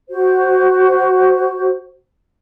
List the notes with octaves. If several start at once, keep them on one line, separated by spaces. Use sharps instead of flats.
F#4 C5